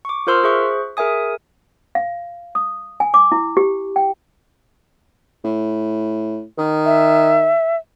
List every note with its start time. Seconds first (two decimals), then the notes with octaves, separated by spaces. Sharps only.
0.05 C#6 D6
0.27 F4 A#4 C5 C6 E6 F6
0.44 G#4 C5 E5 C#6 F#6
0.97 G#4 A#4 E5 G#5 D#6
1.95 F5
2.55 D#6
3.00 G#5
3.14 D6
3.32 E4
3.57 G4
3.96 G5
5.44 A2
6.58 D#3
6.85 E5